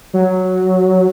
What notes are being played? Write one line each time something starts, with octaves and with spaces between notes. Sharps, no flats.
F#3